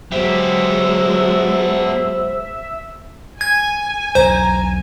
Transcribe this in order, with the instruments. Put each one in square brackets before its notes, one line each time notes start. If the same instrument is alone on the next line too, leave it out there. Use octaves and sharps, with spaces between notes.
[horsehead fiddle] F#3 G#3 [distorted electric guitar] B3 G4 [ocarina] C5 [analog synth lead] E5
[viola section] G#5 [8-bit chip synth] G#6
[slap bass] B1 E2 [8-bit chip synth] C5 [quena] A#5